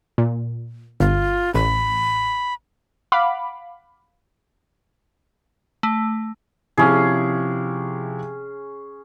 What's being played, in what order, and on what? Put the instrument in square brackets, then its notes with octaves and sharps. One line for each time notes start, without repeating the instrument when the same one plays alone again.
[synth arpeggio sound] A#2
[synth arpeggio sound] G1 [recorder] F4
[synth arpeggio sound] A1 [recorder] B5
[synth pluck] F5 F#5 B5 D6
[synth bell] A3
[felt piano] C3 F3 E4 [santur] C#4 G#4